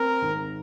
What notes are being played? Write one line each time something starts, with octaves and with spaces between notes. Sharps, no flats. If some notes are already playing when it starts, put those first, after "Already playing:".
Already playing: C4 A#4
G#1